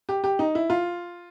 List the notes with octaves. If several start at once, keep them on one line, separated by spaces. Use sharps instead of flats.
G4
G4
D#4
E4
F4